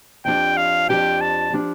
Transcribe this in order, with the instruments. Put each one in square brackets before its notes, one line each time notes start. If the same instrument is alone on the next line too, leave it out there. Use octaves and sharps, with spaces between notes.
[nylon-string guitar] F2 F3 D4 G4 [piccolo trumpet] G5
[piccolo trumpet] F5
[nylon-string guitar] F2 F3 D4 G4 [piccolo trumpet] G5
[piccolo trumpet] A5
[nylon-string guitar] F3 D4 G4